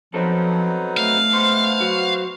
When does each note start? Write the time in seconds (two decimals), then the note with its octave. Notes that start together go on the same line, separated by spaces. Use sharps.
0.14 F3 F#3 B3 C4 D#4 A4
0.97 A3 F5
1.33 G#2 G#3 B3 C5 C6
1.80 F#3 F#4